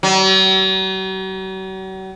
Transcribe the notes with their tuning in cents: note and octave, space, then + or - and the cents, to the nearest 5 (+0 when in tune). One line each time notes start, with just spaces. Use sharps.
F#3 +45